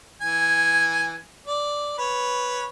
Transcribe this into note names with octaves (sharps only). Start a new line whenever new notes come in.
E3 G#5
D5
B4 C#5